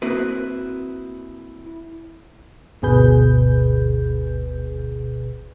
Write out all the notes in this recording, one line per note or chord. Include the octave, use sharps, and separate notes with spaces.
A#3 C4 E4 F#4 B4
G1 D2 B2 G#4 B4 G6